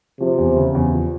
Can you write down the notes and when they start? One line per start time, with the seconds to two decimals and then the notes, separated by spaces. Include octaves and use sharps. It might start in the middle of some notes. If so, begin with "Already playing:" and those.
0.20 C3 F3
0.38 E2
0.56 C#3
0.75 E2
0.93 F3